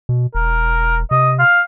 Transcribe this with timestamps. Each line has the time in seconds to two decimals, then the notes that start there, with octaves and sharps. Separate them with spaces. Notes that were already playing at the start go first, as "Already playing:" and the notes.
0.09 B2
0.35 E1 A#4
1.11 C3 D#5
1.39 F5